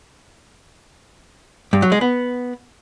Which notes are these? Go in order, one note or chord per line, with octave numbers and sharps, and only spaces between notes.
G2
F#3
G#3
B3